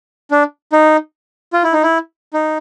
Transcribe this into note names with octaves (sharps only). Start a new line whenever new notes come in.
D4
D#4
F4
E4
D#4
E4
D#4